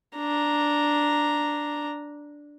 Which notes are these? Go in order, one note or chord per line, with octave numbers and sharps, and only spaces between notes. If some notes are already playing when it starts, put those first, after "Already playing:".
D4 A#5